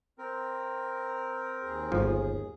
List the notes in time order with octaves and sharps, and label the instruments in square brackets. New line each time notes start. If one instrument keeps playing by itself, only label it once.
[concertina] C4 A#4
[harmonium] D#2 G#4
[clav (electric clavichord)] G1 F3